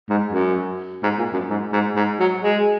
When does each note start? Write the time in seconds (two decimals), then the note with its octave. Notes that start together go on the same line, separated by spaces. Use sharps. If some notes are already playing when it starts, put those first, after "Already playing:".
0.10 G#2
0.32 F#2
1.03 G#2
1.18 A#2
1.33 F#2
1.50 G#2
1.73 G#2
1.96 G#2
2.20 F#3
2.43 G#3